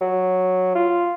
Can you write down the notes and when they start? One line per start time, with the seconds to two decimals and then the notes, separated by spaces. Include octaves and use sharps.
0.01 F#3
0.75 F4